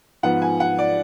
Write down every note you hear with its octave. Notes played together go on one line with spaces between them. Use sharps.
G#2 F3 B3 F#5
G#5
F#5
D5